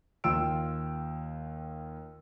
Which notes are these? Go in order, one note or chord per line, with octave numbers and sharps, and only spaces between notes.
D#2 F4 G5 E6 D7